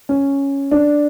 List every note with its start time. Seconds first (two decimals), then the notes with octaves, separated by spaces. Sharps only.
0.09 C#4
0.71 D4